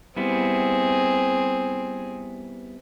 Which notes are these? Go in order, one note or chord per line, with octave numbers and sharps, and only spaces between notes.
G3 B3 C4 E4 G#4